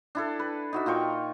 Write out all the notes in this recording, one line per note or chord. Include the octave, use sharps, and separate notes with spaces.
D4 E4 A4
B4
D#4 F#4 E5
A#2 F4 G5 C#6